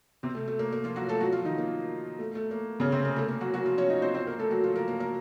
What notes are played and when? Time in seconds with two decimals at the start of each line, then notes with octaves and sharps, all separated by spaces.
0.23 C3 C4
0.35 A3
0.48 A3
0.59 A#3
0.72 A#3
0.84 F3 F4
0.96 F#3 F#4
1.09 A3 A4
1.20 F#3 F#4
1.32 F3 F4
1.45 D#3 D#4
1.58 A#3
2.19 A3
2.35 A3
2.51 A#3
2.80 C#3 C#4
2.92 C3 C4
3.05 A#3
3.16 A3
3.28 A#3
3.41 F#3 F#4
3.54 F#3 F#4
3.66 F3 F4
3.78 C#4 C#5
3.90 D#4 D#5
4.02 C4 C5
4.14 C4 C5
4.27 A#3 A#4
4.39 A3 A4
4.51 F#3 F#4
4.63 F3 F4
4.76 A#3 A#4
4.88 A#3 A#4
5.00 A#3 A#4